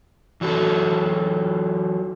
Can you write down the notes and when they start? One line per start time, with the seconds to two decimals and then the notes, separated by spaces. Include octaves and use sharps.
0.41 E3 F#3 F#4 A4